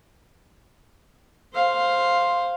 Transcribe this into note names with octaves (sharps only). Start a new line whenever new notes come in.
C5 F5